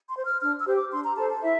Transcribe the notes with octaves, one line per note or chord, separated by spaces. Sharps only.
C6
C5
F6
D4 F6
E6
G4 C5
D6
D4 C6
A#5
A4 C5 A5
A5
E4 E5